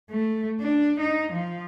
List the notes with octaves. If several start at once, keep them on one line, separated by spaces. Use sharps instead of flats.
A3
D4
D#4
F3